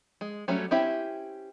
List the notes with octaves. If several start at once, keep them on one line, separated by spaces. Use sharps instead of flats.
G#3
F#3 G3 A3 C#4
C4 C#4 E4 G4 E5